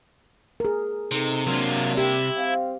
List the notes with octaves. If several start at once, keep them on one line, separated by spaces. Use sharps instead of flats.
G#4 A#4
C3 D#4 A4
F#3 A#3 D4 F4
E4 G4
C4 F5